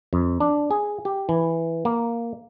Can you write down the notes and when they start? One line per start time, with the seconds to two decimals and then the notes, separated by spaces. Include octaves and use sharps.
0.13 F2
0.40 D4
0.71 G#4
1.05 G4
1.29 E3
1.85 A#3